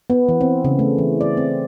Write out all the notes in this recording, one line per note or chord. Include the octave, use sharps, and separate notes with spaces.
B3
E3
C4
C#3
A3
E3
D5
C4